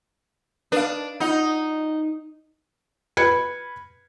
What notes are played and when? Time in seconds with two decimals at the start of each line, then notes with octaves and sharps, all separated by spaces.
0.72 D4 B4 F5
1.20 D#4 F4 F#5
3.17 B4 G#6 C#7